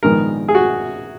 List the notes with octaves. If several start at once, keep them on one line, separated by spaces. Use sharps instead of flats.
A#1 G#2 D#3 G#3 B3 A#4
G#4
F#4